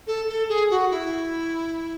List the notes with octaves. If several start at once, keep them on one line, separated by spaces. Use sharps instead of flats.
A4
A4
G#4
F#4
E4